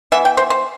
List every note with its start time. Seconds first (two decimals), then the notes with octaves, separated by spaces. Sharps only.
0.12 E3 B3 E5
0.25 G5
0.37 C5
0.50 C5